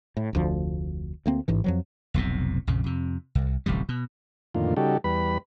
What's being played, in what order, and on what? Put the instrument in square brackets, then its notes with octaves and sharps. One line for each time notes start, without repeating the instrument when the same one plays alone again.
[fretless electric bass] A2
F1 D2 F3
D2 A#3 C4
A1 G#2 E3
F2 F3 F#3
[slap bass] F1 B1 A2 C3
A#1 F2 C#3
F2 C3
C2
D1 A1 C3 G3
B2
[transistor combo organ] F2 A2 D3 D#3 A#3 F4
C#3 G3 D#4 F#4 G4 A4
E2 G3 B4 B5